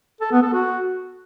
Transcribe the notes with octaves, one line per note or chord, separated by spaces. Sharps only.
A4
B3
A4
F#4